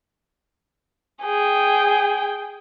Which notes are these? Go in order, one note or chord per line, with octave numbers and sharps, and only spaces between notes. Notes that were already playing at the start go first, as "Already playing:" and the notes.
G#4 G5